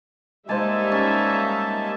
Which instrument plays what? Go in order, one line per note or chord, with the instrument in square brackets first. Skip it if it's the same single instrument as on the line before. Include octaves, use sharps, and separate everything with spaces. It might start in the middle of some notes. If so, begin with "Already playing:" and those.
[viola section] G3 D#4 E5 [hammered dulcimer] G#3 C5 [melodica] A#3 G#5 A5
[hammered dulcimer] C#4